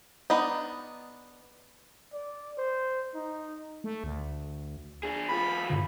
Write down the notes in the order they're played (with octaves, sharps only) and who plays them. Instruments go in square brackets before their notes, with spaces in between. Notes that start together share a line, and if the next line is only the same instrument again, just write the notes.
[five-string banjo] B3 D4 D#4
[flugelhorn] D5
C5
D#4
[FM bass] A3
D2
[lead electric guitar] D4 G#4
[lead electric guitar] E2 F4 [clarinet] B5
[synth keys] G2 D3